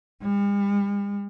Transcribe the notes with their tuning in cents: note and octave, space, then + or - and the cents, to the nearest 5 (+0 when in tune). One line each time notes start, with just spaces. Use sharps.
G3 +45